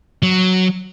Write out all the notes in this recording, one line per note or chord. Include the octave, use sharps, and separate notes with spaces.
F#3